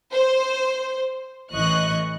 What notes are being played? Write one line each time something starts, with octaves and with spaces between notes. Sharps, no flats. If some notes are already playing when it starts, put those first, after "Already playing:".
C5
A1 E3 D#5 C#6 F#6